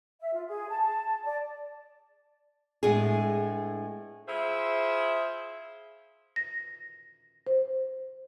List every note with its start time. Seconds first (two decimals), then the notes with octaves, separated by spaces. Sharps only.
0.21 E5
0.34 F4
0.48 G#4
0.69 A5
1.25 D5
2.83 A2 G#3 B3 D4 G#4
4.28 E4 F4 G#4 C5 E5
6.36 A#6
7.47 C5